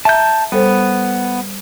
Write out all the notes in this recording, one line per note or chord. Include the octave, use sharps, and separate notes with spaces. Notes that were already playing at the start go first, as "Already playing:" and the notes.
E5 A5 A#5 G6
G3 B3 A4 C5